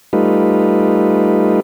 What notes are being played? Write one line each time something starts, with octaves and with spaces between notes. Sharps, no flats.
G3 A3 D#4 F4 B4